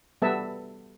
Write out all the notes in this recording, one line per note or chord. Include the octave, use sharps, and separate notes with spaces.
G3 B3 A4 B4 E5 A5